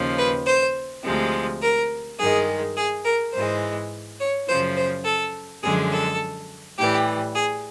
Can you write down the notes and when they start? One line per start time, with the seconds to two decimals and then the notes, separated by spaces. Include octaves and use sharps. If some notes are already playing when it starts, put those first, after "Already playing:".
Already playing: D#2 C#3 F3
0.18 B4
0.46 C5
1.04 D2 C3 F3 G#3
1.62 A#4
2.18 G2 D#3 G#3 G#4
2.77 G#4
3.04 A#4
3.33 G#2 E3 G#3 C5
4.19 C#5
4.47 F#2 C#3 F3 C5
4.77 C5
5.05 A4
5.62 F#2 D3 F3 G#3 G#4
5.91 A4
6.77 A2 E3 G3 G4
7.35 G#4